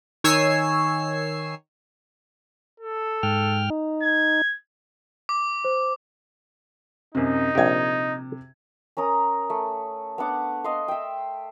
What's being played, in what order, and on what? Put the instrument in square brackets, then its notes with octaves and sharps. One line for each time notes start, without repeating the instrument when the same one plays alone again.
[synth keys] D#3 C#5 G#5 E6 C7
[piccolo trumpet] A4
[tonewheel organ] G#2 G5 F6
D#4
[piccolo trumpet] G#6
[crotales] D6
[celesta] C5
[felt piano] F#2 C3 [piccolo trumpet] D#4
[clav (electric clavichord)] A#1 G4 [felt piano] C3 G#6
[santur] C#4 A#4 A#5 D#6
A3
B3 D4 F#5 D6
D#5 F5 C6
E5 G5